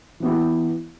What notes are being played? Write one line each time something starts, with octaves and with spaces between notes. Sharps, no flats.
E3 B3 E4 G4